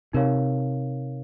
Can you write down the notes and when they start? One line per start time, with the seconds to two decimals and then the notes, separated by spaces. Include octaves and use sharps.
0.13 C3 D#4 A#4 C#5 F5